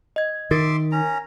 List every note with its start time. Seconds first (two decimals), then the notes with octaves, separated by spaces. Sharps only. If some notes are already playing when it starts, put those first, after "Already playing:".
0.16 D#5 G#6
0.51 D#3 A#4 E5 C6 D6 A6
0.92 C#4 A#5